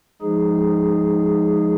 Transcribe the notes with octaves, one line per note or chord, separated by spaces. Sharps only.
F3 G#3 D#4 G#4